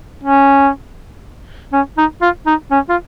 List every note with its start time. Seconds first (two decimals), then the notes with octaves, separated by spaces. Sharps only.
0.24 C#4
1.73 C#4
1.98 D#4
2.22 F4
2.46 D#4
2.71 C#4
2.89 F4